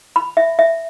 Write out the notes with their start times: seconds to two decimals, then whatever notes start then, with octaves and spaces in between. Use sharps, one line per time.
0.16 B5
0.37 E5
0.59 E5